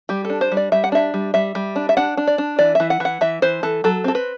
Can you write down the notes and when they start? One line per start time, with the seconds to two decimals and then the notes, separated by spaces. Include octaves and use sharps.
0.09 G3 G4
0.25 A4
0.30 D4
0.41 C5
0.52 G3
0.57 D5
0.72 G3 E5
0.84 F#5
0.92 D4 E5
1.14 G3
1.34 G3 E5
1.55 G3
1.76 D4
1.89 E5
1.97 D4 F#5
2.17 D4
2.27 D5
2.38 D4
2.59 E3 D5
2.75 E3 E5
2.90 F#5
3.00 E3 F#5
3.21 E3 E5
3.42 E3 C5
3.63 E3 A4
3.84 F#3 A4
4.04 C4 A4
4.15 B4